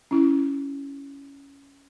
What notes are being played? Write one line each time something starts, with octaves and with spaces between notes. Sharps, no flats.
C#4 E4